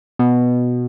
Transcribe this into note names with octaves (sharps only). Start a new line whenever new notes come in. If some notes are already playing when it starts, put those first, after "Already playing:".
B2